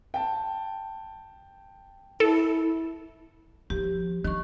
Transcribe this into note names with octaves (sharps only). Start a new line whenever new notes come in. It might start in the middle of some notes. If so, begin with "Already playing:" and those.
G5 A5
E4 A4
F3 G4
D#3 D4 C#6